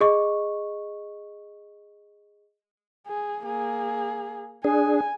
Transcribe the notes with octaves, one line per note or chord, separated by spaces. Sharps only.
G#4 D#5 C#6
G#4
A#3 G#4
D4 G#4 G#5